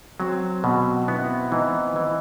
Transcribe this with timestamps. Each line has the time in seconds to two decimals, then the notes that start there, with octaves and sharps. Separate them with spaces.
0.20 F#3 C4
0.64 B2
1.02 F#4
1.08 B3 E4
1.52 E3 D#4
1.96 E3